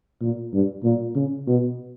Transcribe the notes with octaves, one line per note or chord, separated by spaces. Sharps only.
A#2
G2
A#2
C#3
B2